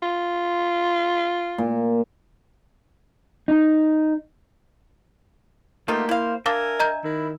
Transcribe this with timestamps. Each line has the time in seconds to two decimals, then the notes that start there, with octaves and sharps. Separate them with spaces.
0.02 F4
1.58 A#2
3.48 D#4
5.88 B2 A3 A#3 D#4 F4 G4
6.09 E4 C5 F5
6.46 D4 A#4 E5 F5 G#5 D6
6.80 D#5 A#5 G6
7.04 D#3 E4